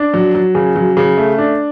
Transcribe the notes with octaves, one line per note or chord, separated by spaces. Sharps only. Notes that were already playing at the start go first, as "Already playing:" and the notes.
Already playing: D4
F#3
F#3
C#3
F#3
C#3
A3
D4